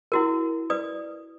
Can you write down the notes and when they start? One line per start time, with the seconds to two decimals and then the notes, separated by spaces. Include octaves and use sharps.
0.12 E4 F#4 A#4
0.70 B4 D5 D#6